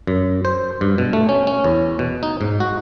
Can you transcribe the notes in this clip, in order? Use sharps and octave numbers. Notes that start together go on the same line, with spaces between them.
F#2
C5
G2
B2
A3
C#4
C#4
E2
B2
D#4
G#2
F#4